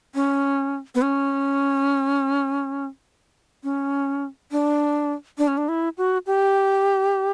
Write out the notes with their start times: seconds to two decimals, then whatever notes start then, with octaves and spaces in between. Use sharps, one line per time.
0.15 C#4
0.95 B3
1.02 C#4
3.63 C#4
4.52 D4
5.38 D4
5.48 C#4
5.57 D4
5.69 E4
5.98 F#4
6.26 G4